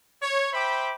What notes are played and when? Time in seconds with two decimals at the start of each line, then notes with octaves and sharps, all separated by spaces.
0.22 C#5
0.53 C5 E5 G5 B5 D6